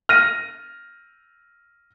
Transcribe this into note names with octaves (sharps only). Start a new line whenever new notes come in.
F6 A#6 D#7